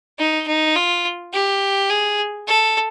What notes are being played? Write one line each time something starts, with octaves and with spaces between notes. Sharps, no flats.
D#4
D#4
F4
G4
G#4
A4